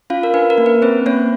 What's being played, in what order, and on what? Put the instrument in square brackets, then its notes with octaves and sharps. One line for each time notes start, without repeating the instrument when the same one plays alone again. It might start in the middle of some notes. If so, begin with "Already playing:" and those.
[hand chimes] C#4 F4 F5
A#4
D4 B4
A#4
A#3
B4
C4 C#4 C5
A#3 C#4 C#5